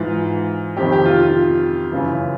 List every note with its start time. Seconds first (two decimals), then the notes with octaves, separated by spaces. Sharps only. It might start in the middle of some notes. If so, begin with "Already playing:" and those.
Already playing: G#2 E3 F4
0.77 F2 C3 D#3 G4
0.92 G4
1.05 F4
1.20 F4
1.92 F#2 C#3 E3